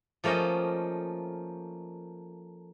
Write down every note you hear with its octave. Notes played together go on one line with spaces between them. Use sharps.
F3 A3 A#3 C#4 D#5